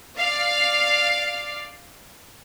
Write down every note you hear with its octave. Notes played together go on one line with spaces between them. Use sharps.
D5 F5